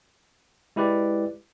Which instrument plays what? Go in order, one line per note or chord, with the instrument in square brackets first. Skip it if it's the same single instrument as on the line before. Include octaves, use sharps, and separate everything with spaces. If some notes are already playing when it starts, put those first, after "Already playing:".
[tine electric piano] G#3 E4 G4 B4 D5